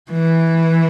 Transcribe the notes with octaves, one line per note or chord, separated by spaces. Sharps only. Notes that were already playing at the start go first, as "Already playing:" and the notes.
E3